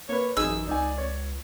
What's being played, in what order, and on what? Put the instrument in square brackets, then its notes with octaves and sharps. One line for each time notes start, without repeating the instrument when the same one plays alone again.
[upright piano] A#3 B4 [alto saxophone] C#5
[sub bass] A1 [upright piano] F#2 D#4 [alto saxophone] G#4 [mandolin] E6
[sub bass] C#2 [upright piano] D#4 G#5 [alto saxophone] D5
[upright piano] C#5